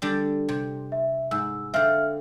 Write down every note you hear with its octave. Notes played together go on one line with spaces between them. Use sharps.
D3 G3 D4
C3
E5
G#2 E6
D3 C4 E5 F5 F6